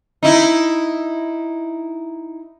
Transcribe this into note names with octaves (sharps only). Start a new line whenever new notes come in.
D#4 E4